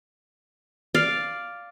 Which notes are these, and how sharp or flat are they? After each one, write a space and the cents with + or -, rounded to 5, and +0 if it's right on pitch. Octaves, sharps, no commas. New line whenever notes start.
D5 +0 F5 +0